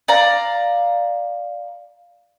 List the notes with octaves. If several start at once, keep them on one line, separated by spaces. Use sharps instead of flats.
D5 F5 A#5